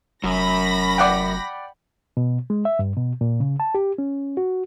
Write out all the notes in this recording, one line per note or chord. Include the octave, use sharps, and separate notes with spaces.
F1 F#2 B5 A#6
D5 F#5 G5
B2
G#3
E5
G2
B2
A#2
C#3
A5
G4
C#4
F#4